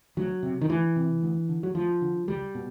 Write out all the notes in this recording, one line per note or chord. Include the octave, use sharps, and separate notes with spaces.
D2 F#3
C3
D#3
D2 E3
C3
D2
D3
F#3
D2 F3
D3
C#2 G3
B2